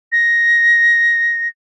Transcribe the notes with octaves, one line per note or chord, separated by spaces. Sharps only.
A#6